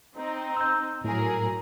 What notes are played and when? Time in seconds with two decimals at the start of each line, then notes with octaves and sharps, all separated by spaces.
0.16 C4 D#4
0.57 E6 G6
1.04 A2 F#3 G#4 A#4